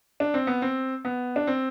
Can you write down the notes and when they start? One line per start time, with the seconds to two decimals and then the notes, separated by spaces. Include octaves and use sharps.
0.20 D4
0.34 C4
0.47 B3
0.62 C4
1.05 B3
1.36 D4
1.47 C4